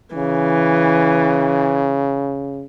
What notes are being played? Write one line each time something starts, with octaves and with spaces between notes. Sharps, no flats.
C#3 E3